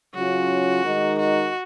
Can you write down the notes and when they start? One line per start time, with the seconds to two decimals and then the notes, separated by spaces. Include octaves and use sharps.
0.15 C#3 F#3 C#4 F4 F#4
0.84 D#3 G#3 D#4 A#4 D#5
1.19 F#4